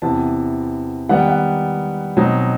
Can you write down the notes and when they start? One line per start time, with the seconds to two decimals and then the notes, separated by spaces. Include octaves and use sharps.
0.02 E2 C3 E3 B3 A5
1.09 D#3 G3 B3 F#5
1.19 G5
1.28 F#5
2.17 B2 F#3 C4 D#4